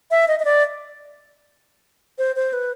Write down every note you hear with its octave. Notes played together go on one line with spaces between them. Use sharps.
E5
D#5
D#5
D5
C5
C5
B4